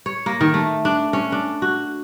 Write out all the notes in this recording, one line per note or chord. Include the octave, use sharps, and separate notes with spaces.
C#5
A#3
D#3
A3
D4
C#4
D4
F#4